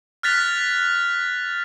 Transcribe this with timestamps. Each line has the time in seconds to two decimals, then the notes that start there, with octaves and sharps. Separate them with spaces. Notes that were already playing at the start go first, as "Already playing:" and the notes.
0.23 F6 F#6 A6 B6 F7